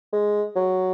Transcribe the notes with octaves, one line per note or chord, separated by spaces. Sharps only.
G#3
F#3